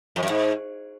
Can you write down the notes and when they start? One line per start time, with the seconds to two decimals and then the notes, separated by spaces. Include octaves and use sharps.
0.16 F2
0.23 F#2
0.29 G#2